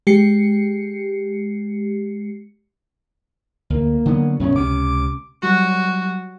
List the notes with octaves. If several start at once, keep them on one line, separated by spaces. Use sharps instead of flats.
G#3 G4 C7 C#7
D2 A#3
D3 F#3 B3
F#2 B2 D#3 C#4
C#2 C3 C#4 D6
F#3 G3 F#4